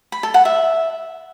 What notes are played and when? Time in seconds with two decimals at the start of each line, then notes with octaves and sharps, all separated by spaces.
0.12 B5
0.23 A4
0.34 F#5
0.45 E5